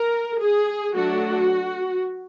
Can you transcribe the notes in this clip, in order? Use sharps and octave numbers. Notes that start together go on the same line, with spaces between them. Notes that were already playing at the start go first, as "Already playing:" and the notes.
Already playing: A#4
G#4
F#3 A3 D4 F#4